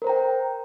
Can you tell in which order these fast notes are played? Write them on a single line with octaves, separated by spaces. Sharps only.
A#4 C5 A#5 G5